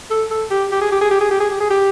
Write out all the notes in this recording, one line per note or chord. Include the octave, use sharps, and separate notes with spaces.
A4
A4
G4
G4
G#4
G4
G#4
G4
G#4
G4
G#4
G4
G#4
G4